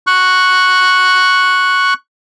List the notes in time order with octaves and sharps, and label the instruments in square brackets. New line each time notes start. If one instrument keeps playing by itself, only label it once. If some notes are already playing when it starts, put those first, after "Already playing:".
[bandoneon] C#6 F#6